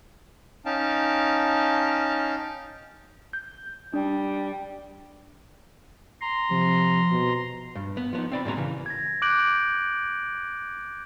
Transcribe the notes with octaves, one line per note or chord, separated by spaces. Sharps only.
C#4 D#4 F5 G5 A5
G6
G3 D4
A#5 C6
C3 F3
B2
G2
B3
F3 B3 D#4
C4 D5 B5
G#2 B2 G#3 A#5
C#3 E3
G#6 A#6
D6 F#6 G6 D7 F#7